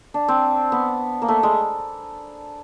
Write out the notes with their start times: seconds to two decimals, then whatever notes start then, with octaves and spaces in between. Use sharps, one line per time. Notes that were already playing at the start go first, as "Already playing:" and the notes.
0.14 D4
0.28 C4
0.72 B3
1.22 A#3
1.28 A3
1.43 G#3